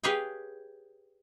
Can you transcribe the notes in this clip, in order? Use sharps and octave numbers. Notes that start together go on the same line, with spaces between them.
G4 G#4 B4 C#5 F5 G#5